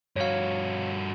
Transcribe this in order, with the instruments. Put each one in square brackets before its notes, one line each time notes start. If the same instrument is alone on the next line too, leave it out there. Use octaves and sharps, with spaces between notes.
[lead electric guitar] G2 F#4 [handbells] C#5 F5